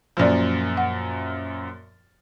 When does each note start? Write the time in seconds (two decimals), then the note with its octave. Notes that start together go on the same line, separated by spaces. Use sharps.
0.17 F#2 A#2 F3 C5 D5
0.77 F#5